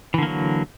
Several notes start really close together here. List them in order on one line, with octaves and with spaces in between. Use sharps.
E3 D3 A#3 F#3